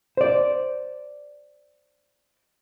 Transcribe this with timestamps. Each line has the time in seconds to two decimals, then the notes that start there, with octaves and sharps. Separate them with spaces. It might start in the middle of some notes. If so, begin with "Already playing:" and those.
0.17 C5 D5